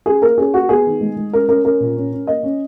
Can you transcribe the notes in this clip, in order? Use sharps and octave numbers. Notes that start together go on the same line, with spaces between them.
C#4 G#4
A#3 A#4
C#4 G#4
A#3 F#4
B3 G#4
D#3
G#3
G#3
C#4 A#4
C#4 A#4
C#4 A#4
A#2
C#4
C#4
A#3 D#5
C#4